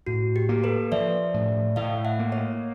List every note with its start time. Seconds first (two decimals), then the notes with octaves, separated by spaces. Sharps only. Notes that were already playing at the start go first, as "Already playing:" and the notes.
0.07 A2 F#4
0.36 G4
0.49 A#3
0.64 A4 B4
0.92 F3 D5 E5
1.34 A2
1.76 A2 D#5 F5
2.05 E5 F#5
2.19 A#3
2.32 C#5 D#5